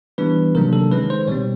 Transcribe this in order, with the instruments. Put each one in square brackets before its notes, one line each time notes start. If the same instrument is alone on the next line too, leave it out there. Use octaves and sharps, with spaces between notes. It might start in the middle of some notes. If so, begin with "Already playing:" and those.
[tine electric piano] E3 G3 B3 D4 B4
C3 D#3 F#3 A#3 D4 A#4
A4
D#3 G#3 C#4 B4
C5
B2 G3 C4 C#5